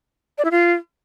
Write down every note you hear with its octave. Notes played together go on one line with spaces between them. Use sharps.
D5
E4
F4